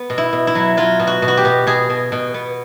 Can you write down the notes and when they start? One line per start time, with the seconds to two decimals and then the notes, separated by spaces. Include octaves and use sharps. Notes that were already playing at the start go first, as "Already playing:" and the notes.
Already playing: B3
0.10 B2
0.18 E4
0.33 B2
0.47 E4
0.55 F#3
0.77 F#3 F4
1.00 B2
1.07 F#4
1.22 B2
1.28 F#4
1.37 G4
1.45 B2
1.67 B2 G#4
1.90 B2
2.12 B2
2.34 B3